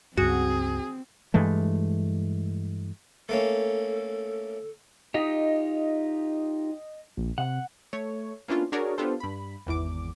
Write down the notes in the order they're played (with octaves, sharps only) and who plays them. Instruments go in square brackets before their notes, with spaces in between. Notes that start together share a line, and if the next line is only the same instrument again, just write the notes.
[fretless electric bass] C#2 G2 [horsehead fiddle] C4 [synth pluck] F#4 [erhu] G#4
[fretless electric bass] G2 E3 G#3 A3
[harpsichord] A3 A#3 C#4 [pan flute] A4
[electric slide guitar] D#4 F4 G4 [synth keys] D#5
[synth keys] A#1
[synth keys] C3 [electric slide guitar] F#5
[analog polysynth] A3 C#5
A#3 B3 C#4 D4 E4 F4
D4 F#4 G#4 A#4 C#5 D5
B3 D4 F4 G4 A4 C5
G2 B5
G#1 E2 E3 D6